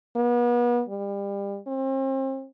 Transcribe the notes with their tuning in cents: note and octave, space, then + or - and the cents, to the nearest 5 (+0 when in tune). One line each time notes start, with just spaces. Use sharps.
B3 -40
G3 +30
C4 +40